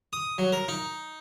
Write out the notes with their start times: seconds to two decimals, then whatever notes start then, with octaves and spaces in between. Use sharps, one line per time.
0.13 D#6
0.38 F#3
0.52 A#4
0.68 D#4